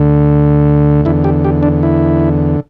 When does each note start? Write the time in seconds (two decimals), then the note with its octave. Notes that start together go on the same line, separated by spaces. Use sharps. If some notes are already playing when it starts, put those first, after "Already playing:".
Already playing: D2 D3
1.05 E2 D3 E4
1.24 G4
1.44 G4
1.63 D4
1.83 E4